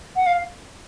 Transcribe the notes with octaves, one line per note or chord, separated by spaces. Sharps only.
F#5
F5